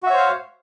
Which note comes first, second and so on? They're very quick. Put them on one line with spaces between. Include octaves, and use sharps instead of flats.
F#4 E5 C#5 C5 F5